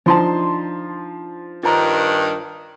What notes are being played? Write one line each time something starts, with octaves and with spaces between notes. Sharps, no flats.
F3 D4 D#4 A5 C6
G2 D#3 F4 C5 A#5